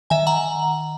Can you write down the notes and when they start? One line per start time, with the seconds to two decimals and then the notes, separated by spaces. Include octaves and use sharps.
0.10 D#3 E5 G#5
0.27 F#5 A#5